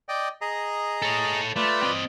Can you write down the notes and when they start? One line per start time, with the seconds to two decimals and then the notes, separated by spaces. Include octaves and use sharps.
0.09 D5 D#5 G5
0.41 G#4 D#5 A#5
1.02 A4 C#5
1.56 A3 F4 B4 D5
1.83 C4 D#5